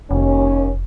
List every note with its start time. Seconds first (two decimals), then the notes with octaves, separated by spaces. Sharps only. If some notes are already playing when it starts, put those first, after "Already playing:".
0.11 F1 D#2 C#4